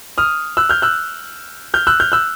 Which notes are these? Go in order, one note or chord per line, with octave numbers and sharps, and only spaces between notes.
D#6 F6
E6 F#6
F6 G6
E6 F#6
F6 G6
E6 F#6
F6 G6
E6 F#6